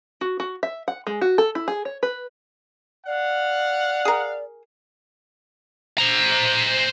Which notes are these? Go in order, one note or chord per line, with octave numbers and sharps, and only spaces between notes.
F#4
F#4
E5
F#5
G#3
F#4
A4
E4
G#4
C#5
B4
D5 F5 F#5
G#4 A#4
C5 A#5